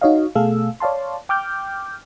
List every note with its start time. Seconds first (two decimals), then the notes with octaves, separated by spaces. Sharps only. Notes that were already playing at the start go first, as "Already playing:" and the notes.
0.01 D#4 F#4 C#5 D#5 F5
0.35 B2 A3 G#4 A4 F5 E6
0.80 C#5 D5 F5 A5 C6
1.29 G5 D6 F6 G6